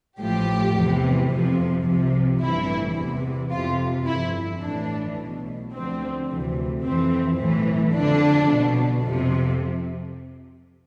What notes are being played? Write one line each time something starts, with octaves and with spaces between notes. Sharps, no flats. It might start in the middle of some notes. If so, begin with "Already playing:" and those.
A1 A2 F3 G4
E2 C3 E3
F2 C3 F3
C2 C3 F3
A1 G2 E3 E4
E2 C3 E3
F2 C3 E3 F4
G1 F2 E3 E4
A1 A2 E3 D4
B1 B2
D2 D3 F3 C4
D2 C3 E3
F2 E3 C4
B1 A2 E3
F2 D3 F3 D4
B1 B2
F2 C3 F3